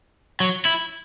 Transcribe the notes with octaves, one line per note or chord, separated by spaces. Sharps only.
F#3
E4